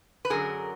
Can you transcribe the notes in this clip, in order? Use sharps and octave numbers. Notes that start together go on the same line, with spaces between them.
B4
F#2 D3 F#3 G#4 A#4